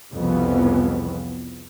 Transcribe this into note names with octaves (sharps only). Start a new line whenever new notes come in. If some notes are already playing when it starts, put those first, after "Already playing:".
C2 F2 C#3 E3 F3 B3